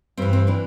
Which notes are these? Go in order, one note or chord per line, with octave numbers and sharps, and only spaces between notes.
G2 E3 C4
C4
E3 D4